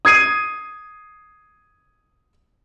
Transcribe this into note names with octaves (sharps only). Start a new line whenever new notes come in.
D#6 G#6 C7 D#7